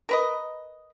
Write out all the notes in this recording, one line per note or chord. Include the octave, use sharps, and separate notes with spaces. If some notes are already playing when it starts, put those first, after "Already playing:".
A#4 B4 D#5